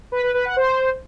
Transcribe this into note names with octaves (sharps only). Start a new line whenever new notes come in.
B4
B4
B4
F#5
C5